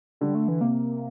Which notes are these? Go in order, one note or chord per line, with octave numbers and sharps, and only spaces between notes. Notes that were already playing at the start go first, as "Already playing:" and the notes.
D3 G3
A3
E3
C3 A#3